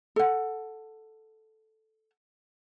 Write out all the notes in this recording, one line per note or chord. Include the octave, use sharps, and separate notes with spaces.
A4 F#5